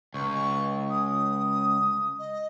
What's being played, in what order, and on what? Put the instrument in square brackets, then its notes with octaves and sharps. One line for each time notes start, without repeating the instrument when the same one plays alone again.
[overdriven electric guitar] C#2 [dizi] C#6
[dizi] D#6
D#5